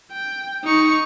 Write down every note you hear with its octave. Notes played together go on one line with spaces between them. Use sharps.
G5
D#4 C#6